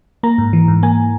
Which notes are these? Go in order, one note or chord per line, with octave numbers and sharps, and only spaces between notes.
A#3 A#5
G#2
E3
G#2
A#3 G#5